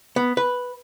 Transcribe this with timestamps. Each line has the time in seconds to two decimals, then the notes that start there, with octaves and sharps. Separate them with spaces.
0.16 B3
0.37 B4